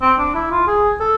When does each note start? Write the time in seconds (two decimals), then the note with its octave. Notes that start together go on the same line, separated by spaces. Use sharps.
0.02 C4
0.19 D4
0.35 E4
0.51 F4
0.67 G#4
1.00 A4